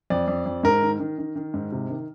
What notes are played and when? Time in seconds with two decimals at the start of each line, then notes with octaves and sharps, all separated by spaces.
0.10 F2 D5
0.28 F2
0.46 F2
0.63 G#2 A#4
0.82 D#3
0.99 D#3
1.18 D#3
1.36 D#3
1.54 G#2
1.72 C3
1.90 D#3